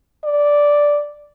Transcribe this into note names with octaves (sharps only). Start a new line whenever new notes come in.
D5